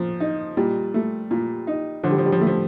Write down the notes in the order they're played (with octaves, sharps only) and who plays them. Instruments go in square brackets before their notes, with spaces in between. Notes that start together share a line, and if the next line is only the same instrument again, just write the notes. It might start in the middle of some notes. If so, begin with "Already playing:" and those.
Already playing: [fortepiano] A#2 [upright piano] F3
[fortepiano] D#4
[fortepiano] A#2 [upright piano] G3
[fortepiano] A3
A#2
D#4
[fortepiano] D3 [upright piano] F3
[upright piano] G3
F3
G3
F3
[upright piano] G3 [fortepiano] A3
[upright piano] F3